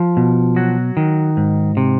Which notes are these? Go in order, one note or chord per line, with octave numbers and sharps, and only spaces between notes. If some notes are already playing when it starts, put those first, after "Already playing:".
Already playing: F3
B2
F#3 F#4
D#3
G#2
C3